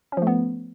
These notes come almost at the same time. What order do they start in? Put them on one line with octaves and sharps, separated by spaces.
C#4 F3 A3 B3